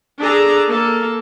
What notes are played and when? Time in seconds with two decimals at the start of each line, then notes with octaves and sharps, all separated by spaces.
0.19 D4 G#4 A4 A#5
0.68 A#3 A4